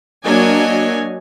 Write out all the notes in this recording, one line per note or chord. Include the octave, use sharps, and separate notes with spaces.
F#3 A#3 D4 C#5 D#5 G#5